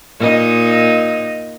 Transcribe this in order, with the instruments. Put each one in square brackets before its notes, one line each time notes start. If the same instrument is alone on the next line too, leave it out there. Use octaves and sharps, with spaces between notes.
[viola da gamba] A#2 D#4 D#5